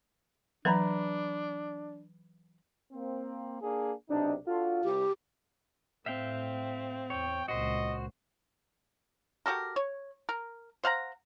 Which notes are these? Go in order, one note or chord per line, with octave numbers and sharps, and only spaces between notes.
E3 F#3 D4 B4 A#5 B5
A#3 C4
A#3 D4 G#4
B1 C3 D4 D#4
D4 F4 F#4 A4
C2 G4
A2 C4 E5 F5 G5
E2 C#5 G5
C#2 A#2 F#4 C5 D#5
F#4 G4 A4 A#4
C#5
A#4
C5 F5 F#5 A#5